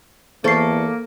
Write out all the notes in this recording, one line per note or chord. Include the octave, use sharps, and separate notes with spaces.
E2 A#3 A4 C5 C#6 C7